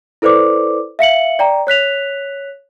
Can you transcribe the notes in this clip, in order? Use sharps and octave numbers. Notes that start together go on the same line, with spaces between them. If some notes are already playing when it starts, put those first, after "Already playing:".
E4 A4 B4 C5 D5 D6
E5 F5 C#7 F#7
D5 G5 A#5
C#5 F#6 B6 F7